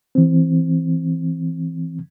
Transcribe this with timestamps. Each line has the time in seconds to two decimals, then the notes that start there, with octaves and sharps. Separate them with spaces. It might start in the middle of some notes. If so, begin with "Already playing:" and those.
0.15 E3 C4